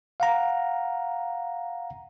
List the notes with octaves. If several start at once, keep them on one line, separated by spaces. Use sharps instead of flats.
F5 F#5 A#5